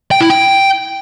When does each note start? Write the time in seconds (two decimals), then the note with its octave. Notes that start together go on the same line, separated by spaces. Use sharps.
0.11 G5
0.21 E4
0.30 G5